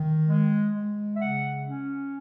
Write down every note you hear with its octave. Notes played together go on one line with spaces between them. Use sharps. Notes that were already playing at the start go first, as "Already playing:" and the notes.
Already playing: D#3
G#3
G#3
E5
C#3 F#5
C#4